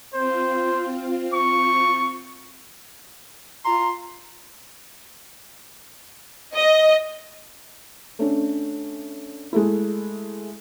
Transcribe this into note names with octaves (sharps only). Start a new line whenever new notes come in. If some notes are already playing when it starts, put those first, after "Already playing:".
C4 F4 C5
C#6
F4 A#5 C6
D#5
A3 C#4 D4
G#3 A3 E4